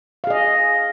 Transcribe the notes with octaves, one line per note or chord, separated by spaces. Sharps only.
G#4 D#5 F5